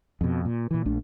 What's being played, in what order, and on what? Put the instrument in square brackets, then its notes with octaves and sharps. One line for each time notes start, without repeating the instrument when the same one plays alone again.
[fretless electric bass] F2 B2
A#2
A#2 E3
A#1 A3 D4